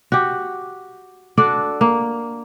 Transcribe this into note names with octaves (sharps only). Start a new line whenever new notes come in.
F#4 G4
D4 F#4 A4 D5
A#3